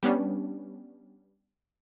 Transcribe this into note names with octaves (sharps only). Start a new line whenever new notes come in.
G3 B3 C#4 D4